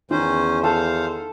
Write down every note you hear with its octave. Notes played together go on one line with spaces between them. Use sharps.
E2 D#3 C#4 C5
A4 C5 F5